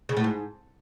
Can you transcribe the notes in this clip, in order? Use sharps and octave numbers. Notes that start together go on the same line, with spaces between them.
C#3
A2
G#2